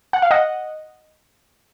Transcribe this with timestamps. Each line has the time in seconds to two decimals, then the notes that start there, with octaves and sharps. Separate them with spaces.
0.13 F#5
0.22 F5
0.31 D#5 F#5